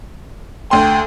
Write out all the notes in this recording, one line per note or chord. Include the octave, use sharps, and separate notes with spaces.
D2 G5 C6